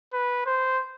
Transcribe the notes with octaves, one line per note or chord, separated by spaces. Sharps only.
B4
C5